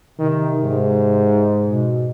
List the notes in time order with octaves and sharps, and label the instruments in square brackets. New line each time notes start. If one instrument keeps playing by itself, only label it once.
[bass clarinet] C3 [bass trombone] D#3
[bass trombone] G#2
[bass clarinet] B2